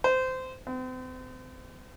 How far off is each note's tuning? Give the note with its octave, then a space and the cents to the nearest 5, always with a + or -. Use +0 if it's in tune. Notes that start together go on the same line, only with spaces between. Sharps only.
C5 -20
C4 -40